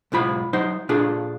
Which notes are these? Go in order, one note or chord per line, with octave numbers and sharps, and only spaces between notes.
B1 G#2 F4 B5
F#3 D#4 C5 F#5
A#2 D4 F4 G#4 A4